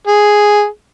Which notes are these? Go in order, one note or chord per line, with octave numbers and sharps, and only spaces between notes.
G#4